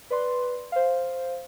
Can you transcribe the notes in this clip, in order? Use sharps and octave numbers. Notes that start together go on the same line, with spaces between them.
B4 D5 C6
C5 F5